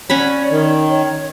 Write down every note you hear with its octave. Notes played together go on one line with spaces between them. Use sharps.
C#4 C#5 D5 F#5 B5
D#3
C#5